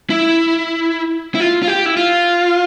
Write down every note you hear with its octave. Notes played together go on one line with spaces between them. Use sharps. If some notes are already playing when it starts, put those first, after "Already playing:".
E4
E4
F4
F4
G4
E4
F4